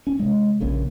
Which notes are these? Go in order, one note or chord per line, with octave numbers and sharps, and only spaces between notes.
C#4
C3 G#3
A#1 A#2 C#3